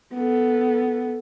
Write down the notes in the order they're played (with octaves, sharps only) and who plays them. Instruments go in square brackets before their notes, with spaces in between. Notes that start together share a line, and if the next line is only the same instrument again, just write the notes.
[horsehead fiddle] B3 A4